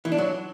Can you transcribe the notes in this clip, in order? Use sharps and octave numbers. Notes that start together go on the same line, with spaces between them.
E3
D4
F#3